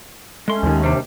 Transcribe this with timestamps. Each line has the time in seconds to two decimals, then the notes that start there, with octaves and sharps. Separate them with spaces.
0.48 G#3 A3 C#4 C6
0.63 D#2 D#3
0.83 C3 G3 D4